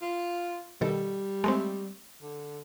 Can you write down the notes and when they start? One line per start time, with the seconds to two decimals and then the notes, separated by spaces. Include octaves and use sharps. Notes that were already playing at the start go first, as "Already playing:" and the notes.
0.02 F4
0.81 B2 D#3 G3 A4
1.44 G#3 A3 C4
2.22 D3